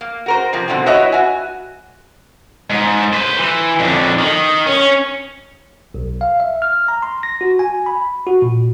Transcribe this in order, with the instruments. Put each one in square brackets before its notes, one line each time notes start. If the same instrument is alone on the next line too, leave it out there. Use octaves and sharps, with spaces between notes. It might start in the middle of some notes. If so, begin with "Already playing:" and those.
[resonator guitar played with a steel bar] A#3
F#4 A#4 C5
C3 F3 A#3 C4
B2 D3 E3 F3 C4
E4 F#4 B4 C#5 D#5 E5
F#4 G#5
[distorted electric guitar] G#2
B4 C5
E3
F2 D3
D#3
C#4
[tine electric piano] B1
F5
E5
F6
A#5
C6
A#6
F#4
G#5
B5
F#4
A#2